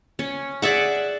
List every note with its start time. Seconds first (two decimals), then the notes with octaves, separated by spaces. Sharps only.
0.19 C#4
0.62 G#4 D5 E5 F#5